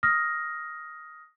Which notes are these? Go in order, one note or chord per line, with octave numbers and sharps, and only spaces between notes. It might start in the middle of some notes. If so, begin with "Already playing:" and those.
D#6 F6 A#6